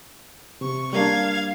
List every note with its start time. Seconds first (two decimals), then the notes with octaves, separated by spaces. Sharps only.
0.61 C3 C#6
0.93 G3 A#3 D4 F5 G#6